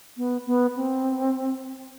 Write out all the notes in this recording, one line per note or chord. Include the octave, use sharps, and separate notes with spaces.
B3
B3
C4